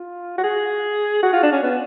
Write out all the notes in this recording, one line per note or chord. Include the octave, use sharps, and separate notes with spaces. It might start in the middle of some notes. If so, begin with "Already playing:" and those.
Already playing: F4
F#4
G#4
F#4
F4
D4
C#4
B3